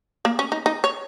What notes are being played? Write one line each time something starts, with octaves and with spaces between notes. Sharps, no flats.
A#3
C#4
D#4
D#4
C#5